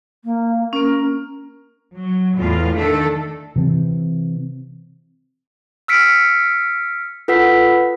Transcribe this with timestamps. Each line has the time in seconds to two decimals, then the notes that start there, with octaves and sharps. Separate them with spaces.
0.24 A#3
0.73 A#3 C#4 A#4
1.94 F#3
2.37 E2 A2 F4 F5
2.74 D#3 A3 D4 A4
3.56 C3 E3 C4
5.88 E6 F6 B6 C#7 D7
7.28 F4 A4 B4 F#5 E6 B6